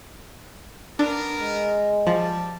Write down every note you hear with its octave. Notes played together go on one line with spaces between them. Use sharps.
B3 D4 A#4
G#3
F3 G3 A5